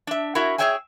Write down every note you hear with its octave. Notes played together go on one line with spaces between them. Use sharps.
D4 E5
E4 F#4 A#4 E5
G#4 B4 C#5 E5 G5 G#5